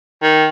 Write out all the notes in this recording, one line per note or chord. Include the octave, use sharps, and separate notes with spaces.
D#3